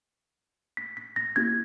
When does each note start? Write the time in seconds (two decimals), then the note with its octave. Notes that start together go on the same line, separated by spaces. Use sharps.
0.77 B6
0.97 B6
1.16 A#6
1.36 A#3 C#4 E4 G4 G#6